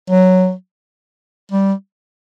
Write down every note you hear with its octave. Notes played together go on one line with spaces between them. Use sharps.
F#3
G3